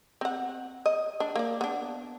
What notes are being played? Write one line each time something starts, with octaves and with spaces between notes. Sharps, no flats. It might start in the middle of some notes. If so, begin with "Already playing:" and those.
C4 F#5
D#5
D4
A#3 D5
B3 D4